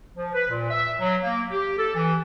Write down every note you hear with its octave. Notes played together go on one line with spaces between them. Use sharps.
F3
B4
A#2
E5
F#3
A#3
G4
A4
E3